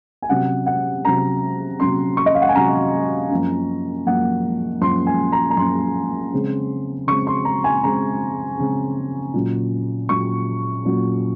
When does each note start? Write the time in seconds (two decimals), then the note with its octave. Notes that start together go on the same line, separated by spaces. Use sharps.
0.22 G#5
0.29 C3 F#3 C#4 F#5
0.66 F#5
1.04 C3 F#3 C#4 A#5
1.80 C3 F#3 C#4 C6
2.17 C#6
2.26 D#5
2.34 F5
2.42 F#5
2.49 G#5
2.55 C3 F#3 C#4 A#5
3.30 F#2 F3 A#3 C#4
4.06 F#2 F3 A#3 C#4 F#5
4.81 F#2 F3 A#3 C#4 C6
5.07 G#5
5.32 A#5
5.50 A#5
5.56 F#2 F3 A#3 C#4 C6
6.32 C#3 G#3 C4
7.07 C#3 G#3 C4 C#6
7.27 C6
7.45 A#5
7.64 G#5
7.83 C#3 G#3 C4 A#5
8.58 C#3 G#3 C4
9.34 A#2 F#3 C#4
10.09 A#2 F#3 C#4 C#6
10.85 A#2 F#3 C#4